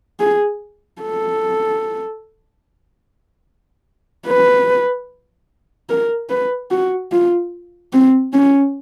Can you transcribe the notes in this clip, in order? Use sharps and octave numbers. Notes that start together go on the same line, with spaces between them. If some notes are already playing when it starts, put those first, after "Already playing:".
G#4
A4
B4
A#4
B4
F#4
F4
C4
C#4